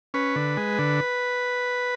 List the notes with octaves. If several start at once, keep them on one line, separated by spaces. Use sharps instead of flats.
C#4 B4
D3
G#3
D3